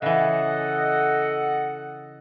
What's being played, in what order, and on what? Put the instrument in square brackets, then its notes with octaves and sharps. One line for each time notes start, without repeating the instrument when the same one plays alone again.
[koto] C#3 E3 [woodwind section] A4 D#5 F#5